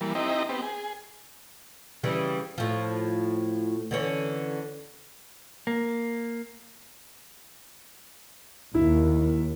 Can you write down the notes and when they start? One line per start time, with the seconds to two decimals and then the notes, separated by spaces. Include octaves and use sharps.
0.01 E3 G3 A#3
0.15 C4 D#4 E4 G4 D#5 A#5
0.49 B3 C4 G4
0.62 G#4
2.03 C#3 E3 G3
2.58 A2 F3
3.91 D3 E3 C#4
5.67 A#3
8.74 D#2 E4